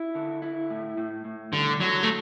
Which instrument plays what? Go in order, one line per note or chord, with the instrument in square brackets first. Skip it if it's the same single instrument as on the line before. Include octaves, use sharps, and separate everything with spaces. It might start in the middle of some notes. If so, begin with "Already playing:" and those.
Already playing: [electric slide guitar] E4
D3
E4
A2
A2
A2
[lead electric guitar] D3 [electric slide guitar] G3
[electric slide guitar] D3 [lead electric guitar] F#3
[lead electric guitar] A3